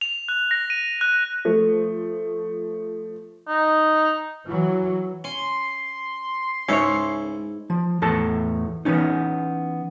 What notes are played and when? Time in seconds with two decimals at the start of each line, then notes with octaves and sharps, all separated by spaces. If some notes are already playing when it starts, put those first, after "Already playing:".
0.01 F7
0.29 F#6
0.51 A#6
0.70 D#7
1.01 F#6
1.45 F3 A3
3.48 D#4
4.46 E3 F#3
5.24 C#4 C6
6.69 C#2 G#2 C#4 E4 A4 C#5
7.70 F3
8.02 E2 A2 A4 A5
8.85 E3 B3 C#4 D#4